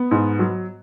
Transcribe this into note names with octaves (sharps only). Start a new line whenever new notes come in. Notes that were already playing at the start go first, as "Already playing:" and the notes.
Already playing: B3
G#2
F#3